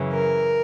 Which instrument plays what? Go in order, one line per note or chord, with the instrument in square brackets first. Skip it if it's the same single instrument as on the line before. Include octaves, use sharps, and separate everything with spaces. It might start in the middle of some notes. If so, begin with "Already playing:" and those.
Already playing: [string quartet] F#2 C#3 E3
A#4